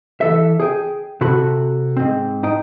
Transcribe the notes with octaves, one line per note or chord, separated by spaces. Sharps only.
E3 A4 E5
G#4 G5
C3 F#4 A4 B5
G#2 C4
D#4 D#5 G5